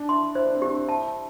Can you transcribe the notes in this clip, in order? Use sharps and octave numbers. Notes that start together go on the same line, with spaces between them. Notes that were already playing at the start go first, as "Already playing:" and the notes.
Already playing: D4 A5
E4 C6
E4 C5
D4
C4
D4 G4
E4 A5